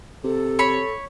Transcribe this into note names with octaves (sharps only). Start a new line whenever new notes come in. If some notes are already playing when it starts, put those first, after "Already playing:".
C3 A4
C#5 B5